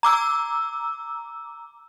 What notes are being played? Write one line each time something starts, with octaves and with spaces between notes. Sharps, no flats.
A#5 D6 E6